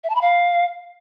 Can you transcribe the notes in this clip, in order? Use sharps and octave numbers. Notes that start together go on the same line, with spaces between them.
E5
A5
B5
F5